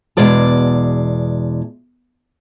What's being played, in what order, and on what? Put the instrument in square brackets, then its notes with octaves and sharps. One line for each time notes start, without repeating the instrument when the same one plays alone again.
[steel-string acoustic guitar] E2 B2 G#3 D5 A5